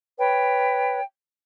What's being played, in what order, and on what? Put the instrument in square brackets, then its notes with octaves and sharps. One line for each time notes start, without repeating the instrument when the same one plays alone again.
[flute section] B4 C#5 G5